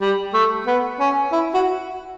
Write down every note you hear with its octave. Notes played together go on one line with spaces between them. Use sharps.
G3
A3
B3
C#4
E4
F#4